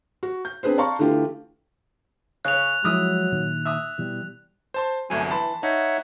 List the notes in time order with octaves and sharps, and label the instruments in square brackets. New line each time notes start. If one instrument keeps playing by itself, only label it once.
[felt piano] F#4
G6
C4 D4 G#4 B4 C5
D5 F5 A5 A#5 C6 C#6
D3 E3 A3 F4 G4
[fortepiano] C#3 C#4 [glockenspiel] F#6 F7
[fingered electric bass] F3 G#3 [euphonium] F#3 [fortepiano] E4 D#6 F6
[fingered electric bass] A#2 D#3
[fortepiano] E5 D#6
[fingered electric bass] B2 E3 [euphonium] G3
[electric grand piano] C5 A5 C6
[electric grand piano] G1 C2 F#3 [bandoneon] A3 G#5
[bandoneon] E3 [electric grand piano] A5 B5 C6
[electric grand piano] D#4 [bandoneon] C#5 E5 F#5